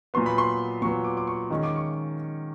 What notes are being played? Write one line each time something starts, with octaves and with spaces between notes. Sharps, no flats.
A#2 F#3 B3 C6
B5
C6
A#2 F#3 B3 C#6
D6
D6
C#6
D#3 G#3 C#4
D6
C#6